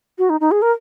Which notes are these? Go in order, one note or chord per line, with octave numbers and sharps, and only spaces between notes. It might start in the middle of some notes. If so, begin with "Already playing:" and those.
F#4
D#4
D#4
G#4
A#4